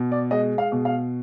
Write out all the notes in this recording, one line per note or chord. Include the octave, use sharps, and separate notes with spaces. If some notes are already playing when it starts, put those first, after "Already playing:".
Already playing: B2
D5
G#3 D#5
F5
B2
F5